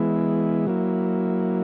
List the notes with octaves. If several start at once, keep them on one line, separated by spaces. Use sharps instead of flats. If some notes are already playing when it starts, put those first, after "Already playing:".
Already playing: E3 G#3 B3 E4
F#3 A#3 E4